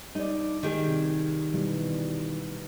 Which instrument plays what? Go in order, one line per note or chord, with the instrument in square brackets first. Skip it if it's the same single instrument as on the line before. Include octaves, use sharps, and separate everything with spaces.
[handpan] G3 D5 [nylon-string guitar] D#4
[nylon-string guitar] D#3 G4 G#4
[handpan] C3
B2 E3 G3